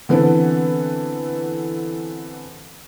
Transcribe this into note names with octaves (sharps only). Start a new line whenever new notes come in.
D3 E3 B3 C4 A4 B4